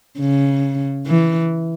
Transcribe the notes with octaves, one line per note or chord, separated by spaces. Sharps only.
C#3
E3